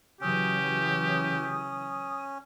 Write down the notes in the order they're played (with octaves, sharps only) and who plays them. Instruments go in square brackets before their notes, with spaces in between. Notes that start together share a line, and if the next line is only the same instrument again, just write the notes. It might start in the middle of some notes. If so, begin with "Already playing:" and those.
[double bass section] C#3 E3 F#3 [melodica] C#4 [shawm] G4 [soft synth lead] D#6